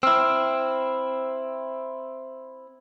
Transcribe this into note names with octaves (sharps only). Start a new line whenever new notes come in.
C4 E4 E6 F6